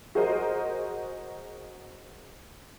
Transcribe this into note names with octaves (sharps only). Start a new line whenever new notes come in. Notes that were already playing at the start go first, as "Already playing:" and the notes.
F#4 G#4 A#4 C5 D#5